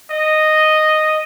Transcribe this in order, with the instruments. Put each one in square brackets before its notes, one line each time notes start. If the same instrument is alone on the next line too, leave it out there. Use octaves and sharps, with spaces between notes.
[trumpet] D#5